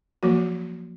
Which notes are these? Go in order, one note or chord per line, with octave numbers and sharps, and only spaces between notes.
F3 F#3 A#3 F#4